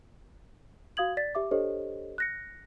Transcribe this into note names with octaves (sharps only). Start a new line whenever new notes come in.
F#4 F5 D#6 G#6 F#7
D5 A6 B6
G4 E5 D6
D4 G4 A4 C5 C#5 D#5
F#6 A#6 C#7